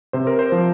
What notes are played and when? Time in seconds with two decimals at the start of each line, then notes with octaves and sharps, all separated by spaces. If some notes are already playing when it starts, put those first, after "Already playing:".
0.13 C3 C5
0.27 A#4
0.39 C5
0.52 F3